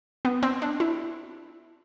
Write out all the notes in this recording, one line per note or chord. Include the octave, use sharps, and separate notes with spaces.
B3
C4
D4
E4